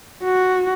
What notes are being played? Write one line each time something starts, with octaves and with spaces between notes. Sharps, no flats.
F#4